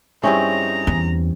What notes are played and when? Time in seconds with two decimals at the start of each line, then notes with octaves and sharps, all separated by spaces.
0.23 G2 C4 C#4 D#4 E4 G#4 A#5
0.87 E2